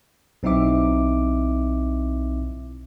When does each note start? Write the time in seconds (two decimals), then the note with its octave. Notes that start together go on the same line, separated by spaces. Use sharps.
0.43 B1 C4 D#4 E4 E5 D6